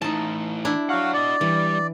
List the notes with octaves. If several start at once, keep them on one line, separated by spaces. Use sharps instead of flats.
A2 E3 D#4 A5
D4 E4
F#4 C#5 F5 F#5
F#4 D5 D#5
E3 G3